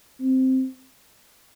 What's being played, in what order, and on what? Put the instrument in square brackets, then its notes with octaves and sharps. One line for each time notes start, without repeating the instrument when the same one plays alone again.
[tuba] C4